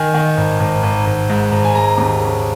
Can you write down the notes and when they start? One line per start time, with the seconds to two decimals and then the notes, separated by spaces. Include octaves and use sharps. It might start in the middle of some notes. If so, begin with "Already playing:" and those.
Already playing: D#3 G#5
0.14 D#3
0.37 G#1
0.60 G#1
0.83 G#1
1.06 G#1
1.30 G#2
1.52 G#1
1.65 G#5
1.74 G#3 A#5
1.98 D#2
2.20 C#3